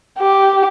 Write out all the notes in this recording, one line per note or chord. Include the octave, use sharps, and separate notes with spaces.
G4